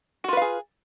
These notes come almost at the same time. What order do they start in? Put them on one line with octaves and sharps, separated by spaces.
F#4 F4 B4 F5 G#4